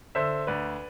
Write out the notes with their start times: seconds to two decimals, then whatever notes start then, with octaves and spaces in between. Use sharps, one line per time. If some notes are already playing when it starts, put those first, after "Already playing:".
0.15 D3 C5 E5
0.47 D2 B4 D5